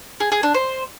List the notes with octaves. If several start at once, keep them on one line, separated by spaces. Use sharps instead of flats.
G#4
G#4
D4
C5